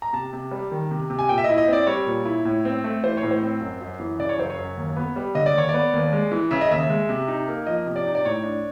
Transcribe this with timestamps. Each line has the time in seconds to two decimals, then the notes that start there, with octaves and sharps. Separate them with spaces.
0.02 A#5
0.13 C3 A5
0.33 C3
0.51 G3
0.72 D#3
0.91 C3
1.10 C3
1.19 G#5
1.29 A#2 G5
1.38 E5
1.44 D#5
1.49 E4
1.58 D#5
1.68 C4 D5
1.87 G3 C#5
2.06 A#2
2.25 E4
2.45 A2
2.65 C4
2.84 A3
3.03 E3 C5
3.17 C#5
3.23 A2
3.31 C5
3.42 C4
3.61 F#2
3.81 F#2
4.00 E3
4.19 C#3 D5
4.29 C#5
4.38 F#2 C5
4.50 C#5
4.58 F#2
4.77 D#2
4.96 B3
5.16 G3
5.35 D3 D#5
5.46 D5
5.54 D#2 C#5
5.69 B3 D5
5.94 D#2
6.13 G#3
6.32 E3
6.51 C#3 E5
6.61 D#5
6.71 D#2 E5
6.90 G#3
7.09 C3
7.28 D#4
7.48 A#3
7.67 F3 D#5
7.86 C3
7.96 D5
8.06 D#4
8.15 D5
8.25 A2 C#5
8.43 D4